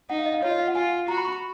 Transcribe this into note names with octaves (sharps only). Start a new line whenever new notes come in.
D#4 F#5
F5
D#5
F5
F4 C#5
D#5
F5
F#5
F4 G#5
F#4 A#5
B5
C#6
B5